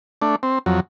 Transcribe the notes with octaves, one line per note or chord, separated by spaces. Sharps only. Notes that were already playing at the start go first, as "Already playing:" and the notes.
A3 D4
C4
F2 F#3